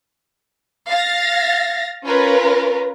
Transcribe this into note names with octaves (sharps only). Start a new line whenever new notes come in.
F5 A6 A#6
C#4 F4 A#4 B4